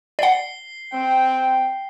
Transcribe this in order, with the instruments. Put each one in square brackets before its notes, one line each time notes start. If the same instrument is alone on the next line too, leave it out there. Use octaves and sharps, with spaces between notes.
[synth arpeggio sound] D5 F#5 [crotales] C7 G7
[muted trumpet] C4 [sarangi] G5